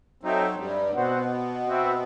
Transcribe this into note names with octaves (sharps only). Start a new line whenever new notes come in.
F#3 C4 D#4 A4 E5 G5
G2 G3
B2 B3 C4 F#4 C5 F#5
C4 F#4 B4 E5 G5